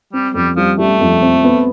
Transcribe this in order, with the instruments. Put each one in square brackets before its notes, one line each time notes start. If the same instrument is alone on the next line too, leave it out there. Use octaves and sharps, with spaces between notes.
[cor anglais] G3 [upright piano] C4
[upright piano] F2 [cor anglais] G3
[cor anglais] F3 [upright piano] G3
[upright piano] G3 [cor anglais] A3
[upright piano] F2
C4
B3